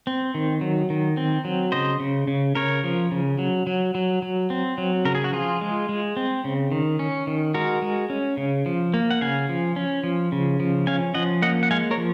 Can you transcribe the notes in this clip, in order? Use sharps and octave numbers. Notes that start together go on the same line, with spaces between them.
C4
D#3
F#3
D#3
C4
F#3
C#3 C5 D#5
C#3
C#3
C#3 A#4 C#5
F3
C#3
F#3
F#3
F#3
F#3
C4
F#3
C#3 A#4
G#4
F#4
F3 F4 G#4
G#3
G#3
C4
C#3
D#3
C#4
D#3
G#3 F#4 A#4
G#3
C#4
C#3
F3
A#3
F#5
C#3 F5 G#5
F3
C#4
F3
C#3
F3
C#4 F5 G#5
F3 D#5 F#5
A#3 D#5 F#5
F#5
G#3 F5 G#5
A#4 C#5
F3